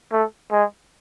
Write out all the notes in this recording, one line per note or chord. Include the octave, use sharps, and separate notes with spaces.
A3
G#3